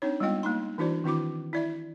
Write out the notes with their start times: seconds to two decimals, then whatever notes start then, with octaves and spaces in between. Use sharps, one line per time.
0.02 C4 D4 D#4 C#5
0.20 G3 G#3 B3 F4 D#5 G5
0.43 A#3 D#4 C6
0.78 E3 D4 E4 F#4 C5 D5
1.04 D#3 C4 E4 F#4 D6
1.53 E4 D5 E5